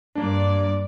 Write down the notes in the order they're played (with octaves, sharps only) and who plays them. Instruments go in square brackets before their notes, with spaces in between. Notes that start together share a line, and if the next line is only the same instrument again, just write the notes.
[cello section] G2 D5 [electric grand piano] A#3 D4